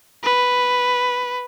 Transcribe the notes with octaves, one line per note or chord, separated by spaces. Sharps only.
B4